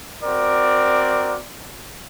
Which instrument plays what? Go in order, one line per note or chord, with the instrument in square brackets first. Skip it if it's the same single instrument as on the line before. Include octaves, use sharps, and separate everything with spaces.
[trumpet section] C4 F#4 A#4 D5